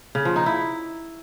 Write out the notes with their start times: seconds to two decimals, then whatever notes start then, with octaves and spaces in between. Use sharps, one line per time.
0.15 C#3
0.25 F3
0.36 D#4
0.46 E4